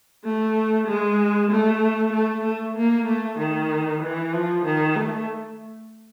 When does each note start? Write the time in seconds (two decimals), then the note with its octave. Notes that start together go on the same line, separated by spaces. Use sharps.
0.24 A3
0.87 G#3
1.51 A3
2.13 A3
2.45 A3
2.77 A#3
3.07 A3
3.39 D#3
4.02 E3
4.33 F3
4.65 D#3
4.96 A3